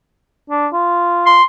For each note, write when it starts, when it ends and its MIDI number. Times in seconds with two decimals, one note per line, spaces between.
0.50 0.67 62
0.72 1.36 65
1.26 1.44 84